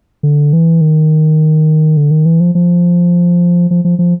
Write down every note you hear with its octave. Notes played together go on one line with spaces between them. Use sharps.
D3
E3
D#3
D3
D#3
E3
F3
F3
F3
F3
F3